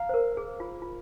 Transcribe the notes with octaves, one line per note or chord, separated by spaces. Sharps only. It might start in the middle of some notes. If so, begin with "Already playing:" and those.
Already playing: F5 A#5
C5
A#4
G#4
F4
F4